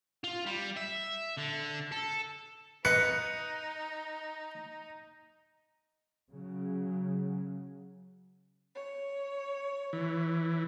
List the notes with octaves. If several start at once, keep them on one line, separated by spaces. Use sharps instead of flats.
F4
G3
E5
D3
A4
D#4 B4 D#5 C#7
C#3 F#3
C#5
E3